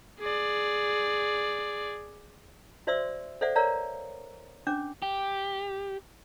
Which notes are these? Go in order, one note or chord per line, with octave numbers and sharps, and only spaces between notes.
G#4 D5
F#4 C5 D5 E5 C6 E6
A4 C5 D5 E5 F#5
A#4 C#5 D5 F5 A#5
C#4 D4 D6
G4